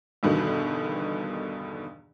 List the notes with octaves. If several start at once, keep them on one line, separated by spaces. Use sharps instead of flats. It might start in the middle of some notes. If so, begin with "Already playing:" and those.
E2 G2 B2 D3 D#3